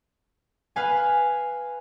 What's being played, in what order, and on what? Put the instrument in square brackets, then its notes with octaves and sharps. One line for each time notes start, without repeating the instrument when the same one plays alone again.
[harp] B4 F5 G#5